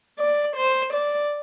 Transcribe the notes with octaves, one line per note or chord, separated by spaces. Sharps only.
D5
C5
D5